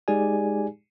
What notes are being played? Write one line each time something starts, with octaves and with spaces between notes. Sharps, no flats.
G#3 D#4 G4 G#4 D5 G#5